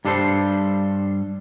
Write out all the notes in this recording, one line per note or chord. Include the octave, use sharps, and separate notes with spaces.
G2 G3 D4 A4 C5